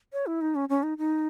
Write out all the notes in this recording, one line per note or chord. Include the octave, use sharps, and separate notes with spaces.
C#5
E4
D#4
C#4
C#4
D#4
D#4